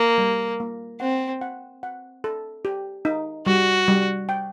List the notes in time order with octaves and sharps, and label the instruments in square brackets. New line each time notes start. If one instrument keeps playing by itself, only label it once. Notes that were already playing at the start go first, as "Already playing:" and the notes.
Already playing: [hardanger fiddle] A#3
[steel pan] G3
A#3
[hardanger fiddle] C4 [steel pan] F#5
[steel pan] F#5
F#5
A4
G4
D#4
[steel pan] G3 [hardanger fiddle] F#4
[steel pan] G3
G5